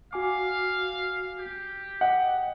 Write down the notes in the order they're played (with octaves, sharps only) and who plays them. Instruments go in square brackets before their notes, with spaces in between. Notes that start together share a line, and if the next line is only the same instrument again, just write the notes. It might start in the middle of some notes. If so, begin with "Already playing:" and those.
[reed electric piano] F#4 G#5 D6 [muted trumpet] F5
[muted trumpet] G4
[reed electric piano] D#5 G5 [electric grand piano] F#5